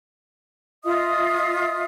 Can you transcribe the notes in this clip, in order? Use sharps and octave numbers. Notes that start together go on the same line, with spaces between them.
F4 D#5 E5 D#6